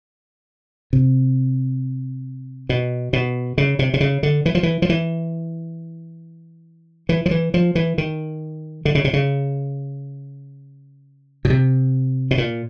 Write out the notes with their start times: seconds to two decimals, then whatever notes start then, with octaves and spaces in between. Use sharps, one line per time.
0.93 C3
2.69 B2
3.13 B2
3.58 C#3
3.79 C3
3.94 C3
4.00 C#3
4.23 D3
4.46 E3
4.55 F3
4.63 E3
4.82 F3
4.89 E3
7.09 E3
7.26 F3
7.31 E3
7.54 F3
7.75 E3
7.98 D#3
8.85 D3
8.95 C#3
9.04 C3
9.13 C#3
11.45 B2
11.50 C3
12.31 B2
12.38 A#2